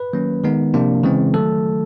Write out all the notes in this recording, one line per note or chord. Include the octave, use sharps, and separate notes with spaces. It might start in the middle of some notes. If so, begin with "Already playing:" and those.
Already playing: B4
D#3 F#3 A#3 C#4
D#3 G#3 B3 D#4
C3 F3 A#3 D4
C#3 E3 G#3 C4
D#3 F#3 A3 A4